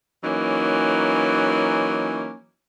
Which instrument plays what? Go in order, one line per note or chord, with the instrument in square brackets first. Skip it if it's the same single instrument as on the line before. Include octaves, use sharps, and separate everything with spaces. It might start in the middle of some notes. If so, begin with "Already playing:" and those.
[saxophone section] E3 F#3 A#3 C#4 D#4